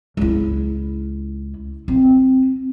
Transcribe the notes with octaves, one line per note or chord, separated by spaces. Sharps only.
C#2 E4
C4